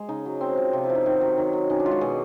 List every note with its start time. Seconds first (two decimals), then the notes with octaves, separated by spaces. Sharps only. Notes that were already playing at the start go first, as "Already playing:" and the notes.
Already playing: G#3
0.09 C#3 D#4
0.26 F#3
0.41 C4
0.57 F3
0.73 C3 F4
0.84 E4
0.89 F3
0.95 D#4
1.06 D#3
1.21 F#3
1.37 D#3
1.53 F#3
1.70 D#3 C#4
1.80 D4
1.86 G#3 F4
1.91 F#4
2.01 B2 G#4